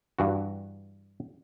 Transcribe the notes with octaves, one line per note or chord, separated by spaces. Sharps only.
G2 E3 F#4